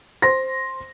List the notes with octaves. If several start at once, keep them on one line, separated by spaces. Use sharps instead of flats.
C5 C6 A#6